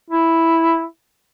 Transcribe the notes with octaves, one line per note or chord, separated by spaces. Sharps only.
E4